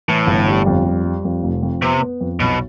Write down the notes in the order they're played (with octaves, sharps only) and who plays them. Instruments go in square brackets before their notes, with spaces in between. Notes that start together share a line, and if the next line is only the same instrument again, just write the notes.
[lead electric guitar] A2 [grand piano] E3
[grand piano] G1
G3
F2
G3
G3
F2
F1
F2
[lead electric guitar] C3 [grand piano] B3
[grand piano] B3
F2
[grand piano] B1 [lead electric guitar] B2